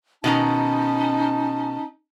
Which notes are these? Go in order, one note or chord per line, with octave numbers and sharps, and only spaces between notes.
B2 D#3 C#4 D#4 A5 A#5